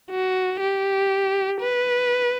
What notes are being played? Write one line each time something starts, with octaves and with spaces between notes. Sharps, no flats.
F#4
G4
B4